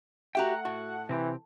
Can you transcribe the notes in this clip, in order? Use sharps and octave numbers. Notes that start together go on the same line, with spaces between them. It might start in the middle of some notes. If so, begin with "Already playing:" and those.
A3 F#4 G4 E5 F#5 G5 A#5
A2 F#4
C3 E3 C4 G4